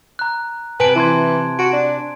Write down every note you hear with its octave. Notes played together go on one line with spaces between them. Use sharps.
A#5 F#6
C3 B4 G#5 A5 D7
E3 A5 C6 G#6
F#4 D7
D4